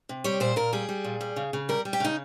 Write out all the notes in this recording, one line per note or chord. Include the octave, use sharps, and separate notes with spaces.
C3
G3 C#5
A#2 C5
A#2 A#4
G3 G#4
G3
A#2
G3
C#3
C#3
G3 A#4
G3
G4
C#3 D#4